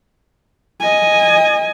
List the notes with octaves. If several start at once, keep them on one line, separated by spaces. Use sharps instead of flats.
D#5 G#5